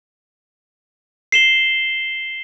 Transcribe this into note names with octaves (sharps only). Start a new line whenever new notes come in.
C7 E7 G7